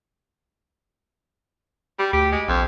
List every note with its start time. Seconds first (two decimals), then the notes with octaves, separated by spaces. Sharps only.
1.99 G3
2.13 D2 G4
2.32 G#3
2.48 A#1 F2